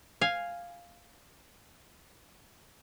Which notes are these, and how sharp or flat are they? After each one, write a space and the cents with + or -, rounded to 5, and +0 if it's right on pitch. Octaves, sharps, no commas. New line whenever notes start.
F5 +0 G#5 -5